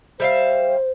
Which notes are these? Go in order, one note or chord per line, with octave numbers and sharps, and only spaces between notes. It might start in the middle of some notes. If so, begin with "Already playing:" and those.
G3 C5 E5 F5